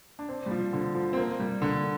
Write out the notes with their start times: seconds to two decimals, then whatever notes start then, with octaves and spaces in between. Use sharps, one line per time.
0.19 D4
0.29 C4
0.46 G3
0.51 F3
0.73 D3
0.95 F3
1.13 C4
1.17 A#3
1.40 G3
1.62 D3